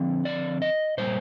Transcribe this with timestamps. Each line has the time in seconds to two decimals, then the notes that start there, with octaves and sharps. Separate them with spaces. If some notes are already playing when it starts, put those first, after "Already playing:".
Already playing: D3 F3 C4
0.25 D5
0.62 D#5
0.98 A#2 G3 A#3 C5